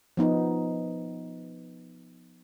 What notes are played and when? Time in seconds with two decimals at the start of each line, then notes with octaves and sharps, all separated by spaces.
0.17 F3 B3 D#4